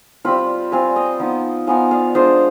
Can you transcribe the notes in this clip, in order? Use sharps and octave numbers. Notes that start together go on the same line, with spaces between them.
G3 C4 F4 G5 B5
G3 C4 F4 F5 G#5
D#5 G5
F3 B3 D#4
F3 B3 D#4 F5 G#5
D5 F5
G#3 D4 F4 C5 D#5